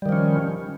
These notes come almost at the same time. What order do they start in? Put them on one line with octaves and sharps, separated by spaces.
G3 D#3 F3 C#4